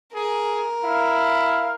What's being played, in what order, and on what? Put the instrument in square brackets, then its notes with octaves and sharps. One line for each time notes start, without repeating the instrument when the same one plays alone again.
[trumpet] G#4 [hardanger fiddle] A#4
[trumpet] E4 [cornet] F5